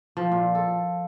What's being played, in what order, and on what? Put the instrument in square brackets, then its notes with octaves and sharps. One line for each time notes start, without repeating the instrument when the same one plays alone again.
[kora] F3
A#2
A4